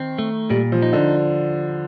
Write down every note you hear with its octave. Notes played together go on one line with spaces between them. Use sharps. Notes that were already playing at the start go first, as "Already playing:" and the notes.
Already playing: D#3 C4
A3
A#2 G3
F3
D#4
D3